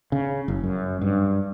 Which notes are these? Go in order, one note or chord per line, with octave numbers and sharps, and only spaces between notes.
C#3
F#1
F#2
G2